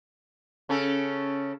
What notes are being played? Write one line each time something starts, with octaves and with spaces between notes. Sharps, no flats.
C#3 C#4 A4